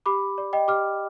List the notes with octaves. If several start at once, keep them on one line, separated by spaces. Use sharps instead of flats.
G4 B5 D6
D5
D#5 G5
G4 D6 F6